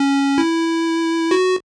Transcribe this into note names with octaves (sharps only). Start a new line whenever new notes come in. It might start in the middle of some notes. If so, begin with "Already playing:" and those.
Already playing: C#4
E4
F#4